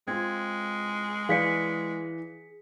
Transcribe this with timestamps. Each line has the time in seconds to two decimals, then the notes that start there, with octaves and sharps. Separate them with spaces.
0.08 G#3 C4 F4 G#6
1.29 E3 G#4 D5 F5 B6 C#7